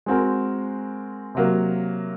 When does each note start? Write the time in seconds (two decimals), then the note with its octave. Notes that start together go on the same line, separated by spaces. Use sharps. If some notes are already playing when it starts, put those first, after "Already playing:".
0.06 G#3 C4 F#4 A#4
1.35 C3 F#3 A#3